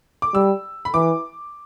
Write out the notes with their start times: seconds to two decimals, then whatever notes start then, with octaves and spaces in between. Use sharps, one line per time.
0.22 D6
0.34 G3 E6
0.85 B5
0.94 E3 D6